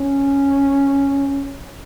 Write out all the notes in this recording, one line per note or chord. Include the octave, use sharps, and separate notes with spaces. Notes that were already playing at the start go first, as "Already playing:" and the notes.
Already playing: C#4